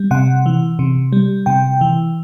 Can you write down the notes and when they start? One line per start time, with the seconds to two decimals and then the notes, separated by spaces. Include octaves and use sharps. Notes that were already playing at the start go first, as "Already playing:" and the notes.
Already playing: G3
0.11 C3 F#5
0.46 E3
0.79 C3
1.13 G3
1.46 C3 G5
1.81 E3